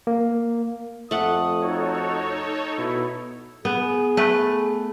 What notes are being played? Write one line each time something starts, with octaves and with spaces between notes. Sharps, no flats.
A#3
F2 A3 F#5 D#6
D#4 F#4 A4 C#5
B2 E4
B3 G#4
A3 B4